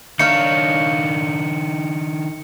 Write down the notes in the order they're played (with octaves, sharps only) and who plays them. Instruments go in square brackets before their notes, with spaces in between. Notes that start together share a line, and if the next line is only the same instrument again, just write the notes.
[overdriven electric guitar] D#3 D4 [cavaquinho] D#4 C#5 F5 [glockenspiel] C#7